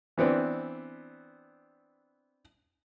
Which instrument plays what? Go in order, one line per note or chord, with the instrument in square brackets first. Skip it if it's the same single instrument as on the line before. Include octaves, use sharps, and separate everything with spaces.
[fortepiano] E3 B3 C4 D4